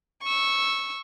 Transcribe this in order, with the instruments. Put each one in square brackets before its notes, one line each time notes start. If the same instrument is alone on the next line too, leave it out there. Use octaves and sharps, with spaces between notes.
[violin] C#6 E6